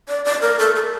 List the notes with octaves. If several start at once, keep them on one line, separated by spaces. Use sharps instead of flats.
D5
D5
A#4
A4
A4